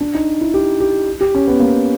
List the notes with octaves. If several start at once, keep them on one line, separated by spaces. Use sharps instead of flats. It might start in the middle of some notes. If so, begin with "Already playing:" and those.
D4
D#4
E4
G4
G4
G4
C#4
B3
A#3